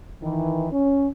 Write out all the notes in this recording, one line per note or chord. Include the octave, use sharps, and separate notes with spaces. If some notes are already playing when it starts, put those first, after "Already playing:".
D#3 E3
C#4